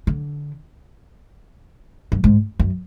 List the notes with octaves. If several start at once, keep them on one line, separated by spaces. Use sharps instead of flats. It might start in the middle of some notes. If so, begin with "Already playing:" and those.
D3
F#2
G#2
F#2